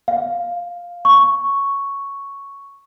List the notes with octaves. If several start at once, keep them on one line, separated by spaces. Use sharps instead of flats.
F5
C#6